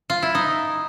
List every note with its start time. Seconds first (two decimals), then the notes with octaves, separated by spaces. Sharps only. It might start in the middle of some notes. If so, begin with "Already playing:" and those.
0.10 F4
0.22 E4
0.35 D#4